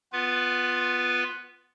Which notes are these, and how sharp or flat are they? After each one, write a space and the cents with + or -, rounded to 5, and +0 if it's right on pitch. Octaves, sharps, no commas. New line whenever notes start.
B3 +0 F4 +5 B4 +0